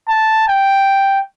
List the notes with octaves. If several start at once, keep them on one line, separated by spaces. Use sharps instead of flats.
A5
G5